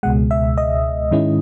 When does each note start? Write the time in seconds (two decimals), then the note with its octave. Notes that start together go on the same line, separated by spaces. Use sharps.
0.03 C#2 B2 G#3 F#5
0.31 E5
0.58 D#5
1.11 G#2 D#3 G#3 C#4 E4